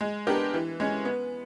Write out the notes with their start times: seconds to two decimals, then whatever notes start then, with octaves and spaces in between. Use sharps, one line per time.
0.01 G#3
0.27 B3 D4 G4 A#4
0.54 E3
0.80 G#3 C#4
1.05 B3